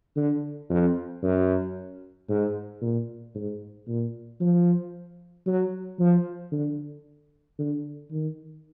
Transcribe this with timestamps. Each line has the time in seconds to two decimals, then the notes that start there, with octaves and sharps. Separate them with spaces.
0.16 D3
0.70 F2
1.23 F#2
2.29 G#2
2.81 A#2
3.35 G#2
3.88 A#2
4.40 F3
5.47 F#3
5.99 F3
6.52 D3
7.58 D3
8.11 D#3